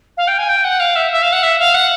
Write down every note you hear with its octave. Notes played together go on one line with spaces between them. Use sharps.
F5
G5
G#5
G5
F#5
F5
E5
E5
F5
F#5
E5
F5
F#5